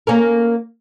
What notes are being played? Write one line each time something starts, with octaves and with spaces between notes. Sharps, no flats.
A#3 C#4 A#4